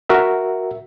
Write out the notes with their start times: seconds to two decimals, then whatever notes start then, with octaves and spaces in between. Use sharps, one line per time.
0.09 F#4 A#4 E5